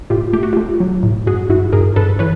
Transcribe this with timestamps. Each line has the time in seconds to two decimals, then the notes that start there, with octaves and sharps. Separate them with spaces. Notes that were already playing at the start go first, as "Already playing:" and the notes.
0.10 A2 F4 G4
0.33 A3 G4
0.43 F#4
0.53 A3 F4 G4
0.80 F#3
1.03 A2
1.27 G2 F#4 G#4
1.50 G2 E4 F#4
1.73 G2 G#4 A#4
1.96 G2 A4 B4
2.19 E3 B4 C#5